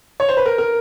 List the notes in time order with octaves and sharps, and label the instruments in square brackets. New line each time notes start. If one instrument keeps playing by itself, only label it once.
[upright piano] C#5
C5
B4
A#4
A#4